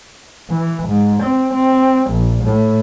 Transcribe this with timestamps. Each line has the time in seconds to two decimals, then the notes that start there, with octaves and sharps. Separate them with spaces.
0.50 E3
0.89 G#2
1.23 C4
1.54 C4
2.11 A#1
2.44 A2